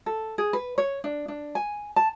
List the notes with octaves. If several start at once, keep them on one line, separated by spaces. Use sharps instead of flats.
A4
G#4
B4
C#5
D4
D4
G#5
A5